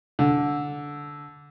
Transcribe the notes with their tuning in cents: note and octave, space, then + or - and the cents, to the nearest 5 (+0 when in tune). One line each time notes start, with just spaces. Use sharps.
D3 -10